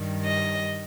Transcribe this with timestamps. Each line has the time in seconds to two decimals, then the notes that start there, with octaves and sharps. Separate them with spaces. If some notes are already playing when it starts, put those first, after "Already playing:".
Already playing: G2 D#3 G3
0.25 D#5